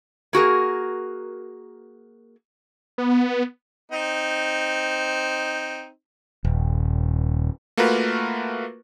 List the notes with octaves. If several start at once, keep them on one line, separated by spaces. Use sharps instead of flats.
A#3 F#4 G#4 A#4
B3
C4 D#4
D#1
A3 A#3 F4 F#4 A#4 B4